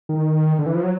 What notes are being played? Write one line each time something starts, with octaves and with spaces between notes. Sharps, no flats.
D#3
D3
E3
F3
F#3